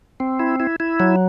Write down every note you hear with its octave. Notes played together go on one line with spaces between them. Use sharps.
C4
E4
E4
E4
F#3